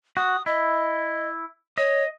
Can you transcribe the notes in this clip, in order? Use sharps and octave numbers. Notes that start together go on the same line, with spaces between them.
F#4 D#6
E4 D#5
C#5 D#5